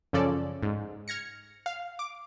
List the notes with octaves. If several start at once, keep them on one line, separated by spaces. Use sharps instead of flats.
F#2 C#3 F3 C#4 A4 D5
G#2
F6 G#6 A#6 C#7
F5
D6